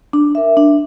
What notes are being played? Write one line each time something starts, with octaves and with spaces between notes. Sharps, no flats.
D4
A#4 E5
D4